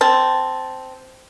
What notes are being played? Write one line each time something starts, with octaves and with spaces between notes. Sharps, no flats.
C4 A5